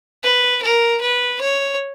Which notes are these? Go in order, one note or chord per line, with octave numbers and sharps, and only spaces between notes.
B4
A#4
B4
C#5